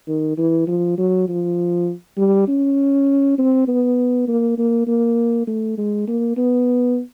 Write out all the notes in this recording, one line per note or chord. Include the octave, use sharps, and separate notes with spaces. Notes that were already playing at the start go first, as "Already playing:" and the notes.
D#3
E3
F3
F#3
F3
G3
C#4
C4
B3
A#3
A#3
A#3
A3
G#3
A#3
B3